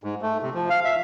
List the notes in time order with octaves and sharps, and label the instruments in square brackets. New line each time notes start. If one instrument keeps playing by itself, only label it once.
[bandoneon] G#2
A3
C3
F3
F5
E5